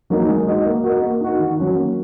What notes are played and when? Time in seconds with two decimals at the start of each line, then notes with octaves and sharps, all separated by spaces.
0.10 F#3 A#3 D#4
0.29 G#3
0.47 D#4 F#4 D#5
0.66 A#3
0.84 F#4 A#4 D#5
1.02 A#3
1.20 D#4 F#4
1.39 D#3
1.57 F#3 C#4 F#4
1.76 A#3